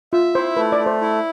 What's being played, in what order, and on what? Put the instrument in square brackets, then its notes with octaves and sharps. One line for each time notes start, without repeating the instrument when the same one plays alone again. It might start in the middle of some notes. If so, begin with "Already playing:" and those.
[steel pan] F4 [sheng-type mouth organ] E5
[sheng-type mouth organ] E4 [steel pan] C5
[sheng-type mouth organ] A3 [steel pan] B4
[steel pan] D5
[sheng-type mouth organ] A3
[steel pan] C5
[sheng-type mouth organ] E4